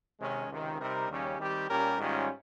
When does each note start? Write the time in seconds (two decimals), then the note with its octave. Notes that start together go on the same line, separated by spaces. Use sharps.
0.19 C3 D#3 G#3 C#4
0.48 C#2 C3 D#3
0.79 C3 G3 C4 D#4 A#4
1.09 D#2 C#3 G3 C#4 G4
1.39 D#3 G3 C4 G4
1.69 A#2 G3 C#4 G4 A#4
1.98 G#2 D#3 G3 C#4 F4